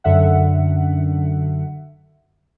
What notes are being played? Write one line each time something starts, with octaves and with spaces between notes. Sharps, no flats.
F#2 D3 E5 F#5